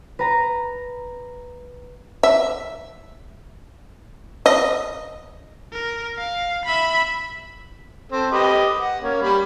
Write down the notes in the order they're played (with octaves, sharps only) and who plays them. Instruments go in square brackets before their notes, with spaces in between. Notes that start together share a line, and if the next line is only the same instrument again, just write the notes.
[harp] B4 A#5
[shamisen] E5
D#5
[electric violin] A#4
F5
E5 B5
[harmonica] C4 A4
G4 B4 D#5
F#5
A#3 C#4
G3 B5